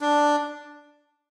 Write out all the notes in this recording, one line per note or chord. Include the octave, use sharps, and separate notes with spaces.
D4